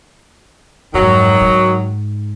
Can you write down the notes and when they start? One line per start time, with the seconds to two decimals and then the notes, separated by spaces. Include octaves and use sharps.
0.94 F2 G#2 D#3 F#3
1.41 G#2